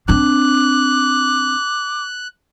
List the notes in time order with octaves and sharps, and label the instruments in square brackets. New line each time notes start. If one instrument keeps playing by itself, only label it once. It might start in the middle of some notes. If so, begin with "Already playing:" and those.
[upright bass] C4 D4 [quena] D6 [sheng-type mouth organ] F#6